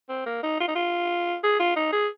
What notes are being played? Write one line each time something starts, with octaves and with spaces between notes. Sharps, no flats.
C4
A#3
D#4
F4
D#4
F4
G#4
F4
D#4
G#4